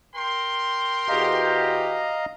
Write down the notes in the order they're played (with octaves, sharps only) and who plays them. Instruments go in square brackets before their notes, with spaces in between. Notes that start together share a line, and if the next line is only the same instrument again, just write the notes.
[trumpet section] A#4 G5 C6
[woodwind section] E2 F#4 G4 [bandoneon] D#5 F5 A#5